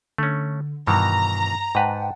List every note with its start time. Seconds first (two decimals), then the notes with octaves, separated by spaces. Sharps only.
0.18 D3 A3 C#4
0.87 G2 B2 D#3 E3 A#5
1.75 G#2 B4 F#5 G5 A5